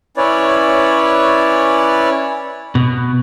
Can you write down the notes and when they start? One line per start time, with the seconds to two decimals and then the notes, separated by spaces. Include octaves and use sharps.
0.17 C#4 E4 B4 C#5 D5
2.75 B2